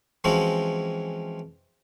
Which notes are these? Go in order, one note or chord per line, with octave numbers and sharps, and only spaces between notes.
E3 F3 G#3 C4 C#4 F#4